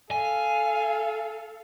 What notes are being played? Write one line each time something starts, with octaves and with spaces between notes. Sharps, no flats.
A4 F5 G#5